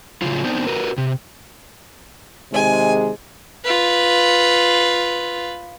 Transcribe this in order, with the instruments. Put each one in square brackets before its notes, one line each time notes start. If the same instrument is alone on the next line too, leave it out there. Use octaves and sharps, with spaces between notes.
[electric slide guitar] A2 C#3 F3 F#3 F4
B3 C4 D4 D#4
F#4 A#4 B4
C3
[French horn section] C3 D#3 G#3 [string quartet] G#5
[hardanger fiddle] F4 B4